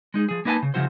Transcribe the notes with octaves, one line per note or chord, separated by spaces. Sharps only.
G#3 D#4 G#4
F3 G#4
A#3 D#4 B4 F#5 G#5 A5
C#3
C#3 E3 F3 E4 F#4 C5